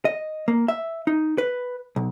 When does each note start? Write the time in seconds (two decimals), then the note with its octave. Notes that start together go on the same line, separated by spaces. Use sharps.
0.05 D#5
0.48 A#3
0.68 E5
1.07 D#4
1.38 B4
1.96 B1